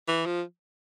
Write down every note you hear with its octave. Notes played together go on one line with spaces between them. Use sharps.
E3
F3